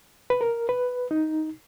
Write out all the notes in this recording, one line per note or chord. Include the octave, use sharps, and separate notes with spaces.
B4
A#4
B4
D#4